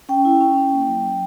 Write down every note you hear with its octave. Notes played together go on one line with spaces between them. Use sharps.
C#4 G5
E4
C#4
C#4
A#3
F#3
F#3